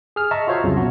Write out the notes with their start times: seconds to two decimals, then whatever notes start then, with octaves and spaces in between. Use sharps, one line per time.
0.16 G#4 F6
0.31 D#5 E5 A5 A#5 C#6
0.47 F4 F#4 C5 C#5 E5 F5
0.64 C2 F2 C#3 F3 F#3
0.77 B2 F#4